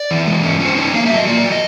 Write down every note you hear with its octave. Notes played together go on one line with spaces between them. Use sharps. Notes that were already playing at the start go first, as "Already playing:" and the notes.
Already playing: D5
E3
G#3
C#4
C#4
C5
D#4 C#5
A#3 F5
F#3 E5
D#5
A#3 D5
F#3
D#5